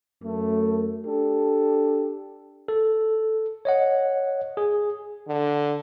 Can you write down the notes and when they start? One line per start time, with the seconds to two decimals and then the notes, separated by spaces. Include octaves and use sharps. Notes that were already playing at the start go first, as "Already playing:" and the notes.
0.23 F#2 A3
1.05 D4 G4 A4
2.68 A4
3.65 C#5 D#5 F#5
4.57 G#4
5.28 D3